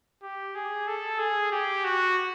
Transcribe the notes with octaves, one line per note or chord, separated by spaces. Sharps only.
G4
G#4
A4
G#4
G4
F#4